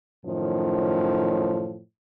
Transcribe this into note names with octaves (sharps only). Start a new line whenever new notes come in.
F#2 A2 D#3 F3